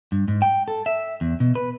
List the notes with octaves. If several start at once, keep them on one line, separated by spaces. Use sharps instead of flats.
G2
G#2
G5
A4
E5
E2
B2
B4